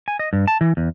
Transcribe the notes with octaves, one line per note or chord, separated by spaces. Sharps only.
G#5
D#5
G2
A5
E3
E2